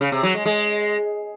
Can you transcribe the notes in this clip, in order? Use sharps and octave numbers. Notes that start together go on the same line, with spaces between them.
C#3
C3
F#3
G#3
G#3